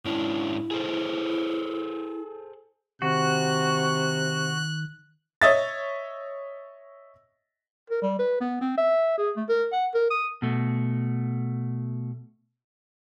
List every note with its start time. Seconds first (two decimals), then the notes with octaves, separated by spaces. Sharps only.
0.05 G#2 C#4 D4 E4
0.71 G#4 A4 C5
3.02 C3 D#3 F#4 F#6
5.42 C#5 D#5 E5 A6
7.90 A#4
8.02 G3
8.19 B4
8.41 B3
8.61 C4
8.77 E5
9.18 G#4
9.36 A3
9.49 A#4
9.72 F#5
9.94 A#4
10.10 D#6
10.42 B2 A3